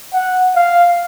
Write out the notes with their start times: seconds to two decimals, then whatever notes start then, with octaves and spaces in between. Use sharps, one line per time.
0.13 F#5
0.56 F5